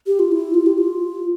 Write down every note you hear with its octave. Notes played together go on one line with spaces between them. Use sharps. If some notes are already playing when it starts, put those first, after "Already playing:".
G4
F4
E4
F4
G4
F4